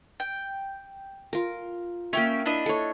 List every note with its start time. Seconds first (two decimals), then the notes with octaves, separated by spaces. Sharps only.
0.20 G5
1.33 F4 A#4
2.13 A#3 C#4 E5 G5
2.46 D4 E4 D#5
2.66 A4 C#5